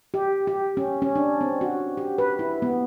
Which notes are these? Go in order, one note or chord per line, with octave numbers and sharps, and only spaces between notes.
G4
G4
C#4
C#4
D4
C4
F#4
G4
B4
E4
B3